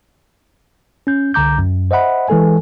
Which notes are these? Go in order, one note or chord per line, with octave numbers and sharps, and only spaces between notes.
C#4 G6
C2 D3 A#5 D6 G6
F#2
C5 D#5 E5 F#5 B5
E3 G#3 A4 G#5